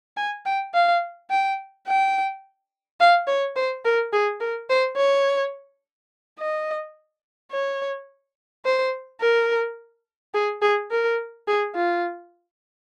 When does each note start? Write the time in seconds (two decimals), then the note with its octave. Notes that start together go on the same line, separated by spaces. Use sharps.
0.17 G#5
0.46 G5
0.74 F5
1.30 G5
1.87 G5
3.00 F5
3.27 C#5
3.56 C5
3.85 A#4
4.13 G#4
4.40 A#4
4.70 C5
4.97 C#5
6.39 D#5
7.51 C#5
8.65 C5
9.21 A#4
10.34 G#4
10.62 G#4
10.91 A#4
11.48 G#4
11.75 F4